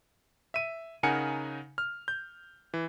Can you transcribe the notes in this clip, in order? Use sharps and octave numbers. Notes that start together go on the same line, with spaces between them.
E5 D#7
C#3 D#4 A#4 F#5 G#5 C#7
F6
G6
E3